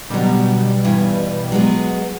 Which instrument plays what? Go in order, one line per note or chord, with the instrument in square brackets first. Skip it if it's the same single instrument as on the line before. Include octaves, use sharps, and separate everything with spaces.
[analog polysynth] B2 G3 [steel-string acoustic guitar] D3 F#3
[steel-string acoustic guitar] G2 E3
F#3 G#3 B3